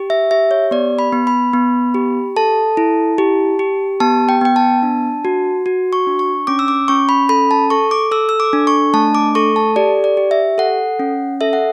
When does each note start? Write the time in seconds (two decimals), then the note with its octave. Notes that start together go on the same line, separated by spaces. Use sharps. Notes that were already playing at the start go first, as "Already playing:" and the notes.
Already playing: G4
0.10 E5
0.31 G4 E5
0.51 C#5
0.71 B3 D5
0.99 B5
1.13 B3
1.27 B5
1.53 B3
1.94 G4
2.36 A4 A5
2.77 E4
3.18 G4
3.59 G4
4.00 B3 A5
4.29 G5
4.41 B3 G5
4.56 A5
4.83 D4
5.25 F#4
5.66 F#4
5.93 C#6
6.07 D4
6.19 C#6
6.47 C#4 D6
6.59 E6
6.68 D6
6.88 C#4 C#6
7.09 B5
7.29 A4 B5
7.51 A5
7.70 A4 C#6
7.91 D6
8.11 A4 E6
8.29 E6
8.40 D6
8.53 D4
8.67 C#6
8.94 A3 A5
9.15 D6
9.35 A4 C#6
9.56 A5
9.76 G4 D5
10.04 D5
10.17 G4
10.31 E5
10.58 A4 F#5
10.99 C#4
11.41 A4 E5
11.53 F#5